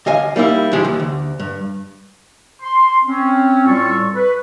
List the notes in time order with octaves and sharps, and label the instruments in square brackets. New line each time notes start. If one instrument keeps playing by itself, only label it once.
[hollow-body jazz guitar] D2 D#5 F5 G#5
G3 A#3 D#4 E4
D#3 F3 G#3 G4 G#4
D#2
D2
G2
[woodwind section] C6
C4 C#4
A2 G3 F4 A4 C#6
B4